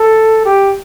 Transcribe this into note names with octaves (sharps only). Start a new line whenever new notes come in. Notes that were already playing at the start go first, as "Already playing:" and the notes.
Already playing: A4
G4